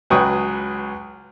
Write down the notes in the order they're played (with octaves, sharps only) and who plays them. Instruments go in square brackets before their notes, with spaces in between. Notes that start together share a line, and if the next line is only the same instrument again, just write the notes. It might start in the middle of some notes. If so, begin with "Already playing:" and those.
[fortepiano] C#2 F#3 B4 G5 C#6 D#6